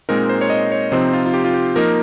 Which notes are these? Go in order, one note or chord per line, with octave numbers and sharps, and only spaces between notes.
A#2 G#3 C4 D#4 A#4
C5
C#5
D#5
C#5
C3 F3 C4 D#4 C5
F4
F4
G4
F4
G4
F3 A#3 D#4 A#4